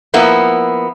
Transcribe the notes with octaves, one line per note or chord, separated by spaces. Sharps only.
F3 A#3 B3 E4